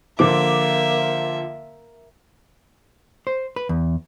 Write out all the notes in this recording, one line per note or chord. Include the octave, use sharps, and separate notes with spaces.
D3 F3 A#3 E5 D6
C5
B4
E2